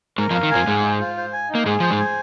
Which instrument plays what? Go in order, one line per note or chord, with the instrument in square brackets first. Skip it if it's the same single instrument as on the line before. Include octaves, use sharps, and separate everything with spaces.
[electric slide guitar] G#2 G#3 [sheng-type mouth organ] A#4
[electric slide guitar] F2 F3
[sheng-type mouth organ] F5
[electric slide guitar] D#3
[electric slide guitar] F2 F3 [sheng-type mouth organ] G#5
[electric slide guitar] G#2 G#3 [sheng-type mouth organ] G#4
[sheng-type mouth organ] C5
F4
C5
G#5
D#4
[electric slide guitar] A#3
[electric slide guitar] G#2 G#3 [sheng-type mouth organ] G#4
[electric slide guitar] F3 [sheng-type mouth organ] C5
[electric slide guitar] G#2 G#3
[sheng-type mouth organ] G#5